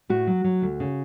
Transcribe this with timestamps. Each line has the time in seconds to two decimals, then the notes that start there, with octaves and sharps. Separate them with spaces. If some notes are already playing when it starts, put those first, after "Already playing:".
0.09 A2 F#4
0.27 F#3
0.44 F#3
0.62 D2
0.80 C#3